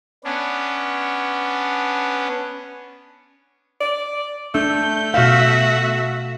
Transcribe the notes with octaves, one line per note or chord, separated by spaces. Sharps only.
B3 C#4 D4
D5
A3 D4 G6
B2 F#4 E5 F5